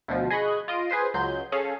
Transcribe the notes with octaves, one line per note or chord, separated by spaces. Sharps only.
D2 B2 F3
G#4 D#5 B5 C#6 F#6
F4 D#5 D7 D#7
G#4 B4 C5 C6
C#2 F#3 C6 G6
C#4 G#4 A4 F5